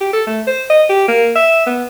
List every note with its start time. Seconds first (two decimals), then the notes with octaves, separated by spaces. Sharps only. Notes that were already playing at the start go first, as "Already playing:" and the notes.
0.01 G4
0.13 A4
0.27 A3
0.47 C5
0.70 D#5
0.89 G4
1.08 A#3
1.35 E5
1.66 B3